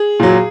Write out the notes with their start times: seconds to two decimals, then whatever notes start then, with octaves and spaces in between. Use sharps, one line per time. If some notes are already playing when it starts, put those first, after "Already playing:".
Already playing: G#4
0.20 A#2 F#3